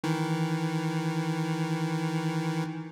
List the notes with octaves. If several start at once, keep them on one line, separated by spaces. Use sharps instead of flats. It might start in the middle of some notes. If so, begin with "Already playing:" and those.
D#3 E3